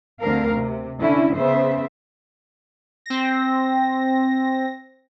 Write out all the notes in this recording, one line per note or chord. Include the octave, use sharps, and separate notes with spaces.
D2 D3 C4 A#4 F5
C3
D3 C#4 E4
C#3 B3 C5 E5
C4 A#6